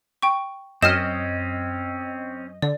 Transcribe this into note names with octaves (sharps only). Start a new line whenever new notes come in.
G5 C#6
F#2 C4 C#4 D#5 F6 E7
D3 D5